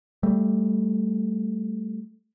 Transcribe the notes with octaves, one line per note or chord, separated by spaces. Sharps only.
G3 A3